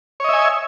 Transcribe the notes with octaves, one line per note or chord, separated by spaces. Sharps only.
C#5 D#5 E5 G#5